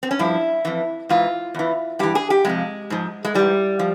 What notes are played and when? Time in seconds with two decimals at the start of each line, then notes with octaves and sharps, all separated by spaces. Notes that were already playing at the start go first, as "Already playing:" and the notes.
0.03 C4
0.11 C#4
0.19 G2 F3 E4
0.65 F2 E3
1.09 G#2 E3 F4
1.54 E2 E3
1.99 G2 E3 G4
2.15 G#4
2.30 G4
2.45 F2 C3 F3 G#3
2.90 G#2 F3
3.25 G#3
3.34 G#2 E3 G3
3.79 F3